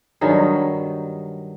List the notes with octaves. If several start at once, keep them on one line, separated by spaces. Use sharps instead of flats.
G2 D#3 F#3 G#4